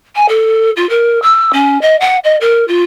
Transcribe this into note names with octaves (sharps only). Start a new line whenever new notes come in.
G#5
A4
F4
A#4
E6
C#4
D#5
F#5
D#5
A#4
F4